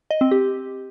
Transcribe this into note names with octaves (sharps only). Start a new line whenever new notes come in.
D#5
C4
G4